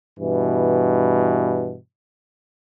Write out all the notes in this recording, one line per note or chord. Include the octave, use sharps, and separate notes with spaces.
G2 B2 E3